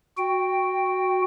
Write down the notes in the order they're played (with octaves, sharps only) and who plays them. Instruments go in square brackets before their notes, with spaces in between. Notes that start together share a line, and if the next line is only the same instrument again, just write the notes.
[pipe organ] F#4 G5